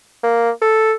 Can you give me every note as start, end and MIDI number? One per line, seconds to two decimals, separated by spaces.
0.23 0.51 58
0.61 0.94 69